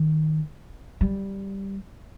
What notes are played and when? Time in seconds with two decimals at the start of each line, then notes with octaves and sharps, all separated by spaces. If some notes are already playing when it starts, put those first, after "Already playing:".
Already playing: D#3
1.01 G3